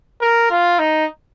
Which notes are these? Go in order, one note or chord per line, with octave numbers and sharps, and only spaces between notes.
A#4
F4
D#4